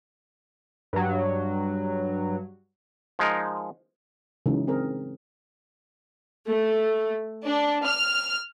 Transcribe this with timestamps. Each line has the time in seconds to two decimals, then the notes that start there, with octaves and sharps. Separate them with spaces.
0.93 G2 F#3
3.19 F3 G#3 D#4 A#4
4.46 C#3 E3 F#3 G#3 D#4
4.67 C4 G#4 A#4
6.48 A3
7.45 D4
7.85 F6